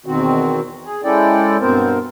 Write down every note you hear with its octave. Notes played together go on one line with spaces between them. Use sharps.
E2 B2 D#3 C4 F#4
G#4
G#3 C#4 E4 A4 D5 G5
G2 B2 B3 C4 A#4 C5